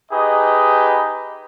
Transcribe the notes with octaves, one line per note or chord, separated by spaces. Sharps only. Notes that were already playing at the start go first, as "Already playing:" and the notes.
D#4 G4 G#4 B4 D#5